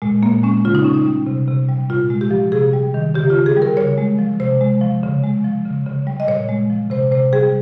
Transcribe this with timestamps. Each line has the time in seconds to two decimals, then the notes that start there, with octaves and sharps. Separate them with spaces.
0.02 A#2 G#3
0.23 A#2 A#3
0.43 G#3 C#4
0.65 C#3 F4
0.75 D#4
0.84 C#3 C#4
0.94 D#4
1.06 G3
1.26 C3
1.48 C3
1.68 G3
1.90 A#2 F4
2.10 G#3
2.21 G4
2.31 F3
2.52 C3 G#4
2.73 G3
2.94 D#3
3.15 C#3 G4
3.30 F4
3.35 C#3
3.46 G#4
3.57 G3
3.62 A#4
3.77 C#3 C#5
3.98 G#3
4.19 F3
4.40 C3 C5
4.61 G#3
4.81 F3
5.03 C#3
5.23 G#3
5.44 F3
5.66 C#3
5.86 C#3
6.07 G3
6.20 D#5
6.27 A#2 C#5
6.49 G#3
6.70 F3
6.90 C3 C5
7.12 C3 C5
7.33 G3 G#4